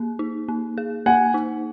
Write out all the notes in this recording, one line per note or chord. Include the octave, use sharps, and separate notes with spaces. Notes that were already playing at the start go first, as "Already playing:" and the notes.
Already playing: A#3 G#4
D#4
A#3
G#4
A#3 F#5 G#5
D#4